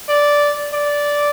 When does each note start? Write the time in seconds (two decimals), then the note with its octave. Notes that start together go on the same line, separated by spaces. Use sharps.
0.09 D5
0.73 D5